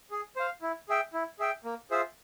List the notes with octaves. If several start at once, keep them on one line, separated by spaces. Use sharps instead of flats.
G#4
C5 F5
E4
G#4 E5 G5
E4
G#4 E5 G5
A#3
F4 G#4 C5 E5